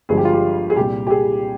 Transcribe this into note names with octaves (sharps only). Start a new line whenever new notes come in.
G1 G2 F3 G#3 G#4
G4
F4
G4
G#4
C2 A#2 G3 G4
G4
G#4